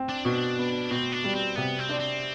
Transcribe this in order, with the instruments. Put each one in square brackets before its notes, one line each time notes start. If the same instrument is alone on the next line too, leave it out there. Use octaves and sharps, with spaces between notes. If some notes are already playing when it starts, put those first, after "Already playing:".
Already playing: [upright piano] C4
[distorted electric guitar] D4
[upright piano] B2
B3
[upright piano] B2 [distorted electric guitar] C4
[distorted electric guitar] D4
[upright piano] G3
[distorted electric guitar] C4
[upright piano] C3 [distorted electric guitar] B3
[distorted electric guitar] C4
[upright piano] D4
[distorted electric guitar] C4